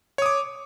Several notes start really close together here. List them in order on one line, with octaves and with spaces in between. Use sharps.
C#5 D#6 D6